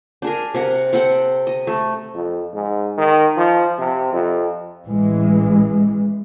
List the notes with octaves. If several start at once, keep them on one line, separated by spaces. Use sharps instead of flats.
D4 G#4 A#4
C3 A#4 F#5
C4 A4 F#5 G5
D#5
A3
F2
G#2
D#3
F3
C3
F2
A1 E3 G#3